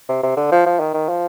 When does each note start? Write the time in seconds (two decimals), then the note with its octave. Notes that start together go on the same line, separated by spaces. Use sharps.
0.09 C3
0.23 C3
0.37 D3
0.52 F3
0.66 F3
0.80 D#3
0.94 D#3
1.08 F3